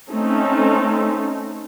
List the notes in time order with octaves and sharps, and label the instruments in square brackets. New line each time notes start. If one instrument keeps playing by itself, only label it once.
[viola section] A3 C4 C#4 D#4 A4